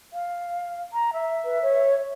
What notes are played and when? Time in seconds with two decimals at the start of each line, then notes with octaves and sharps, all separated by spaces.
0.13 F5
0.93 A#5
1.13 E5
1.44 B4
1.62 C#5